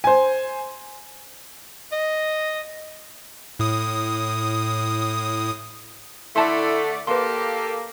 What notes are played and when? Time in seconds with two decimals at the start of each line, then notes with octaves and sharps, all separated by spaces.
0.04 C5 G#5
1.92 D#5
3.59 A2 D#6
6.36 D3 A3 E4 D5 A5 C6
7.07 A#3 G4 A4 B4 C6